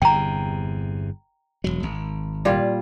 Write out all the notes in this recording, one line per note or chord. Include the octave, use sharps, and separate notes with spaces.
G1 E2 C3 G5 A#5
E1 C#2 F#3
G#1
A#2 G3 F4